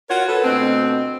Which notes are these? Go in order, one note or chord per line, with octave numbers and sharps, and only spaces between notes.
F4 F#4 A#4 C#5 F#5
A4 B4
D2 B2 C4